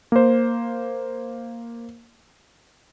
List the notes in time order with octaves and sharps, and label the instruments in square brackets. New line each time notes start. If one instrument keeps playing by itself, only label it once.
[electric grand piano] A#3 C5